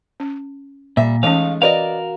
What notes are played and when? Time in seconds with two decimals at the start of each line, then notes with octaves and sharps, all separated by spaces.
0.20 C#4
0.97 A#2 G3 E5
1.23 E3 G#3 A3 C#4 D#4 F5
1.62 F#4 A#4 B4 D5 D#5 F5